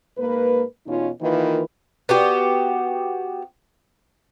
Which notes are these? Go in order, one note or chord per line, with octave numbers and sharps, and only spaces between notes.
G#2 A#3 A#4 B4
E2 B2 C#4 D#4 F4
D#3 E3 A#3 D#4 F4 B4
B3 F#4 G4